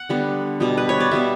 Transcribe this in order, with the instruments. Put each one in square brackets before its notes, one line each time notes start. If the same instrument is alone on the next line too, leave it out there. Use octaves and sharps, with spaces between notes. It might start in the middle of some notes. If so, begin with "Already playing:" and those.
Already playing: [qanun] F#5
D3 G3 B3
B2 G3 B3
B4
C#5
D5
B2 G3 B3 E5